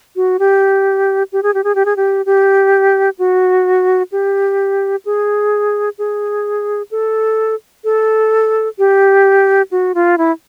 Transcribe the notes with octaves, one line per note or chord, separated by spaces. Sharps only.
F#4
G4
G4
G#4
G4
G#4
G4
G#4
G4
G4
F#4
G4
G#4
G#4
A4
A4
G4
F#4
F4
E4